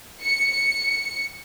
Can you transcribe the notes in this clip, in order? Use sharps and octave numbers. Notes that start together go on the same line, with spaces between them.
C#7